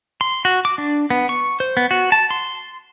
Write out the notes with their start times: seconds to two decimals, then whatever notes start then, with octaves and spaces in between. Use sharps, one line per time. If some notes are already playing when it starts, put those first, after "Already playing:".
0.21 C6
0.45 F#4
0.65 D6
0.78 D4
1.10 B3
1.29 C#6
1.60 C5
1.77 B3
1.91 F#4
2.12 A5
2.31 C6